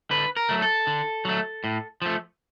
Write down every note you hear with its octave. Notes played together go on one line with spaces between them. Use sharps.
D3 B4
A#4
F#3 A3
A4
D3
F#3 A3
A2
F3 A3